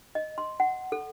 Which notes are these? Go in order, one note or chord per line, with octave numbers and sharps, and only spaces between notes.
D#5
C6
F#5
A4